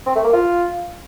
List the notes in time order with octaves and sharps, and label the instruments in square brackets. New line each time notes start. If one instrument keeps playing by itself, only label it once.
[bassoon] C4
A3
A#3
F4